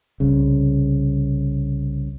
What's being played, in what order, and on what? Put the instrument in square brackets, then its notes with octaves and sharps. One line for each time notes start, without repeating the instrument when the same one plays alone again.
[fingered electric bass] C2 C#3